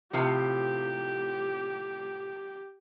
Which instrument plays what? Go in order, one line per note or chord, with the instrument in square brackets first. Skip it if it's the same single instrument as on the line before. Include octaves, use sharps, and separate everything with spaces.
[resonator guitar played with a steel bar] A2 C3 F3 [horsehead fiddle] G4